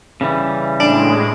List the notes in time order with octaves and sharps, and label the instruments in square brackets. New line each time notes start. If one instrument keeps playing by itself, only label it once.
[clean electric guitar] C#3 E3 G3
[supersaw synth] A2 G#3 [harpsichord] D4